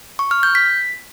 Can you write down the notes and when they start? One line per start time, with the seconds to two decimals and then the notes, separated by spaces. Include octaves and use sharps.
0.19 C#6
0.31 F6
0.43 G6
0.55 B6